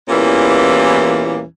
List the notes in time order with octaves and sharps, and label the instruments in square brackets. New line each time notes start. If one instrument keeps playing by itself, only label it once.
[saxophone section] E2 A#2 E3 G3 A#3 C#4